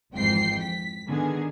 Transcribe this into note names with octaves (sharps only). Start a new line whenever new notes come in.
G#1 F2 G#2 E3 G5 C7
B6
D3 D#3 B3 G#4